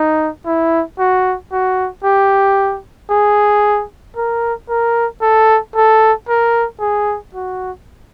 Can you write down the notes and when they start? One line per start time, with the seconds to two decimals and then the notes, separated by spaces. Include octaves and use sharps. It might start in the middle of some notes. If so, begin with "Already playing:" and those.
Already playing: D#4
0.46 E4
0.99 F#4
1.52 F#4
2.04 G4
3.10 G#4
4.16 A#4
4.69 A#4
5.21 A4
5.75 A4
6.28 A#4
6.80 G#4
7.34 F#4